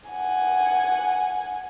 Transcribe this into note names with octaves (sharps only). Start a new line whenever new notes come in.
F#5 G#5